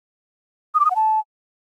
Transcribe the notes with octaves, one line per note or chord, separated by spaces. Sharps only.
D#6
D6
D#6
F#5
A5